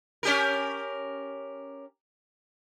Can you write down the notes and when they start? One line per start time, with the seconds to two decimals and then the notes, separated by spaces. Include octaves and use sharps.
0.23 C#4 G4 A#4